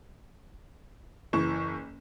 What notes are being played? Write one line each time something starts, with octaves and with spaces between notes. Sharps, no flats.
F#1 E3 C#6 E7